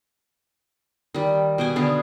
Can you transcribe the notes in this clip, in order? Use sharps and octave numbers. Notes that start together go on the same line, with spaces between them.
D#3 G3
B2 G5 G#5
D3 B3 G#4 F5